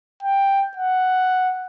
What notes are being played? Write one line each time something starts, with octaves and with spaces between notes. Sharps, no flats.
G5
F#5